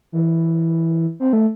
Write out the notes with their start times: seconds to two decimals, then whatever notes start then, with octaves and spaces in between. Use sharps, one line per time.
0.12 E3
1.20 C4
1.33 A3